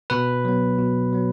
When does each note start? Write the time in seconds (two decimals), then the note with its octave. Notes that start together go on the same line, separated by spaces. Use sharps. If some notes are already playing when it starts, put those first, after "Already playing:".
0.10 B2 B4
0.45 F#3 B3
0.79 B2
1.13 F#3 B3